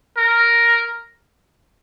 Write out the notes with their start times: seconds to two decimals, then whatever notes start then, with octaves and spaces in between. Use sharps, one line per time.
0.17 A#4